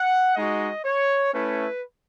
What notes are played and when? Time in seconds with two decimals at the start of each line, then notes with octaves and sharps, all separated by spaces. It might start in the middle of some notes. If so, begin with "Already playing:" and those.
Already playing: F#5
0.36 G#3 D#4 F#4 D#5
0.85 C#5
1.32 A3 C#4 E4 B4